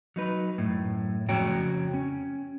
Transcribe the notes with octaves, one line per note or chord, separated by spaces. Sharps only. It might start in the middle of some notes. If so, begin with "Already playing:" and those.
F#3 D#4 B4
F#2 A2
F2 C#3 F#4 C#5 G5 A#5
C#4